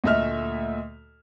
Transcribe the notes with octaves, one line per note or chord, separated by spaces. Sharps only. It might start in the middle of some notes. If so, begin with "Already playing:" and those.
D2 A#2 A3 D#5 E5 F6